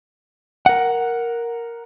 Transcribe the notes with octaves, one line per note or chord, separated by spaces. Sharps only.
A#4 F#5